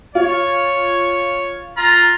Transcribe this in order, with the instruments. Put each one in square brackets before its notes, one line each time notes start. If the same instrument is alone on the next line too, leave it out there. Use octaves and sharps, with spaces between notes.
[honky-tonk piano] F4 [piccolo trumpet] C#5
[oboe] F4 [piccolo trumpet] A#5